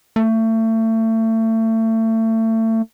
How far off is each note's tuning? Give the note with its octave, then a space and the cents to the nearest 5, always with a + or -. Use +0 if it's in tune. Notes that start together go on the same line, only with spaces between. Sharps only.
A3 +30